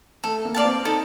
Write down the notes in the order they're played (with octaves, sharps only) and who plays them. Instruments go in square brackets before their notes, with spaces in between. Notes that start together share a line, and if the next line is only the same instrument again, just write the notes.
[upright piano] A3 [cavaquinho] A4
[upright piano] A#3
[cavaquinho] D5 F5 A5
[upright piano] C4
[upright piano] D#4 [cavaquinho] A4